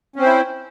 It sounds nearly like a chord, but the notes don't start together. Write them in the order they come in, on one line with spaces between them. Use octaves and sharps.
C#4 C4 C5 E4